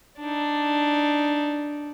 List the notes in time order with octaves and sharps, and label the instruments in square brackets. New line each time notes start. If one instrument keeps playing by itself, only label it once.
[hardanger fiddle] D4 D#4